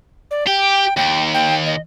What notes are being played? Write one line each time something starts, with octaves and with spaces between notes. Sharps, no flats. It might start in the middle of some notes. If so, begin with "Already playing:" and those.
D5
G4 G5
D#2 G5
G5
D#5